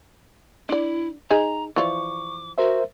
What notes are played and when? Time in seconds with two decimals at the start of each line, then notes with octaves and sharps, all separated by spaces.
0.69 D4 E4 D5
1.30 D#4 G#4 G#5 A#5
1.76 E3 F3 D5 C#6 D6
2.58 F#4 A#4 C5 E5